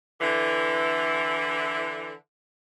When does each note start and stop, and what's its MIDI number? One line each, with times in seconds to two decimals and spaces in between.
0.20 2.11 50
0.20 2.11 52